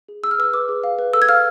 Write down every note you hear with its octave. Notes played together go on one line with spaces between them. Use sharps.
G#4
G#4 E6
F6
B4 E6
B4 D6
G#4
F5
B4
A4 E6
G#6
F5 F6